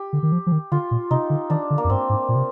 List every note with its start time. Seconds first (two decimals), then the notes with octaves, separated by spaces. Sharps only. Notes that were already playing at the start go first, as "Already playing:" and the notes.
Already playing: G4
0.13 D3
0.23 D#3
0.32 F3
0.47 F3
0.52 D#3
0.72 D3 F4
0.91 A#2
1.11 C3 D#4
1.30 D3
1.50 D#3 D4
1.70 D3
1.78 A#3
1.84 F2
1.90 G2 C4
2.09 G#2
2.29 A#2
2.35 C3